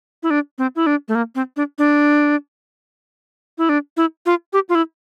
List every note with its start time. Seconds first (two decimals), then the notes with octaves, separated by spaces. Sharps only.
0.23 E4
0.30 D4
0.58 C4
0.76 E4
0.86 D4
1.08 A3
1.15 A#3
1.35 C4
1.56 D4
1.78 D4
3.58 E4
3.69 D4
3.97 E4
4.26 F4
4.53 G4
4.69 F4
4.75 E4